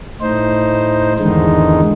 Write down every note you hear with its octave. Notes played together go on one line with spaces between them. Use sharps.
A2 D#4 C5
E2 G#2 D3 D#3 G#3 D#4